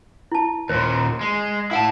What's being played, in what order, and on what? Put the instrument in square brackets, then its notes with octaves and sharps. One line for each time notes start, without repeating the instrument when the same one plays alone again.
[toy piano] E4 A5
[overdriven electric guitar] D#2 A#2 [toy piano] C5
[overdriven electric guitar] G#3
[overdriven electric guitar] E4 A5 [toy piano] F5 F#5